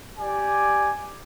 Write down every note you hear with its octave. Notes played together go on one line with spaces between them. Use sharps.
G4 D5 G#5